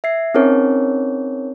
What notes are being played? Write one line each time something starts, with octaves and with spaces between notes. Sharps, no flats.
E5 G#6 C7
C4 C#4 D#4 G#4 A#4 C#5